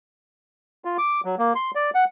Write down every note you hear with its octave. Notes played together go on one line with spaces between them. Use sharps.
F4
D6
F#3
A#3
C6
D5
F#5